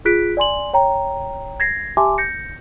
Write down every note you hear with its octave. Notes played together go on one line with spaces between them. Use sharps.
F4 G#4 F#6 B6 D7
D5 G#5 C6 F#7
C#5 G5 A#5
G#6 A#6 C7
G4 E5 G#5 A5 C6 D6
G6 A#6 C#7